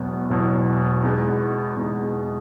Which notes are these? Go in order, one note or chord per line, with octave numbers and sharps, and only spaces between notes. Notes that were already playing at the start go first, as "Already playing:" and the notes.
Already playing: E1 E2 B2 F#3 B3
E1 E2 B2 F#3 B3
E2 B2 G#3 B3 D#4
E2 B2 G#3 B3 D#4